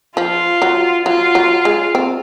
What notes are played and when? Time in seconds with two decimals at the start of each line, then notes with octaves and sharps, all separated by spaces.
0.17 F3 F4
0.62 F#3
1.06 F#3 F4
1.35 F#3
1.65 G#3
1.95 C4